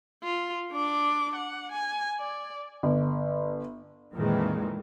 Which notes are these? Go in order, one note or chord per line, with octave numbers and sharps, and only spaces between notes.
F4
D4 D6
F#5
G#5
D5
G1
F2 A#2 D#3 E3 G#3